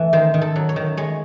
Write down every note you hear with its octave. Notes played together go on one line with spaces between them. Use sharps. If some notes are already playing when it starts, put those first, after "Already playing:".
Already playing: E3 A3
D#3 C5
D#3
A4
F#3
C#5
D#3
G#3 C#5